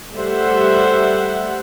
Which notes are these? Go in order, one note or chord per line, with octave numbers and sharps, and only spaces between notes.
G3 A3 C5 E5 F#5